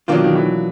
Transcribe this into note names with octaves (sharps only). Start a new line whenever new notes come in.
B2 D#3 F#3 A#3 D4 F4
D#3
E3